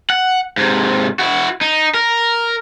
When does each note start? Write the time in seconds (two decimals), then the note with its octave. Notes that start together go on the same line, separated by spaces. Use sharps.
0.10 F#5
0.58 G#2 C3
1.19 E4 F#4
1.61 D#4
1.94 A#4